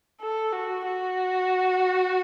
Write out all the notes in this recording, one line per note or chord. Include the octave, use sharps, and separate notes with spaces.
A4
F#4
F#4